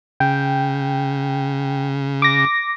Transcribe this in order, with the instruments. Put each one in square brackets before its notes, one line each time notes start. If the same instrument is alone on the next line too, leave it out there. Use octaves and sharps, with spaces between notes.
[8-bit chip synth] C#3 [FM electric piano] G5
[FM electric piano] D6 A#6